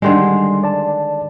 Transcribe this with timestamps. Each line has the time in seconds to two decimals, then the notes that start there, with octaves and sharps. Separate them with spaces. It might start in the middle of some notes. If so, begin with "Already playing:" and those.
0.02 D3 D#3 G3 G#3 C6
0.63 D5 A5